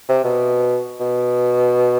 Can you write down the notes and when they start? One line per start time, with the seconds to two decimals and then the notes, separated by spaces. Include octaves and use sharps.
0.09 C3
0.24 B2
1.00 B2